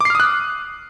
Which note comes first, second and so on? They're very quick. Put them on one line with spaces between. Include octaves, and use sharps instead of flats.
D6 C7 F6 D#6 F#6